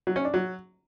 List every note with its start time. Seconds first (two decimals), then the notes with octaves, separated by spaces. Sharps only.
0.07 F#3
0.16 C#4
0.25 D4
0.34 F#3